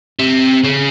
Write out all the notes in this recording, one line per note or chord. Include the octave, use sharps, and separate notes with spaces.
C3
C#3